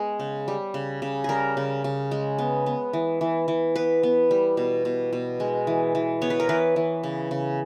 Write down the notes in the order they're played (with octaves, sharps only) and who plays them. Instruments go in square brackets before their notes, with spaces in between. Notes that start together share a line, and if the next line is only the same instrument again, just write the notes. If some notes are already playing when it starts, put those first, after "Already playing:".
Already playing: [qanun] G#3 B3 G#4
C#3
G3
C#3
C#3
G3 G#4 A#4
C#3
C#3
G#3
B3
B3
E3
E3
E3
B3 B4
B3
G3
B2
B2
B2
G#3
E3
E3
B3 C#5
B4
A#4
E3 B4
E3
C#3
C#3